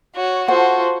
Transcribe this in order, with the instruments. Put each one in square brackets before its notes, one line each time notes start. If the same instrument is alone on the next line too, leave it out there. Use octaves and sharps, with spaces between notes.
[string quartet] F#4 C#5
[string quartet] F4 F#4 A4 [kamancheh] C5 [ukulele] F#5